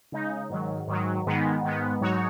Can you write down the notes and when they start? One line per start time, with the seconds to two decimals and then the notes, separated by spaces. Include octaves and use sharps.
0.12 C#3 G#3 D#4
0.50 G#2 D#3 F#3
0.88 G#2 D#3 F#3
1.26 G#2 D#3 G#3 B3
1.63 G#2 D#3 G#3 B3
2.01 G#2 F#3 D#4 F#4 C#5